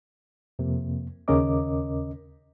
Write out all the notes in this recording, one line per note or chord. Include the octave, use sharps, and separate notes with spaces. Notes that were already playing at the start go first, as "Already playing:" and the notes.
F2 C3 A#3
D#2 C#3 C#4 A#4 D#5 D6